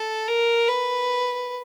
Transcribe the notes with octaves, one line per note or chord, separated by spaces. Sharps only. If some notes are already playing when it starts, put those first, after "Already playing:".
Already playing: A4
A#4
B4